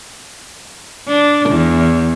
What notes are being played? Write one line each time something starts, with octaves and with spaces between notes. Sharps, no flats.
D4
E2